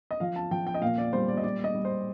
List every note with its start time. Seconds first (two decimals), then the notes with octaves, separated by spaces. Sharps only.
0.11 D#5
0.20 F3 F5
0.36 A5
0.51 F3 G5
0.67 G5
0.74 D#5
0.82 A#2 F5
0.98 D5
1.13 G3 C5
1.28 D5
1.37 D#5
1.43 G3 D5
1.64 D#5
1.75 G3
1.85 C5